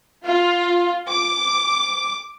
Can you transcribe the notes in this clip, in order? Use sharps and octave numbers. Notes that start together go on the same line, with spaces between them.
F4
D6